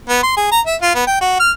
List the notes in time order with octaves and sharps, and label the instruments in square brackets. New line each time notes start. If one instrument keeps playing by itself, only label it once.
[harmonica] B3
C6
G#4
A#5
E5
F4
B3
G5
F#4
F6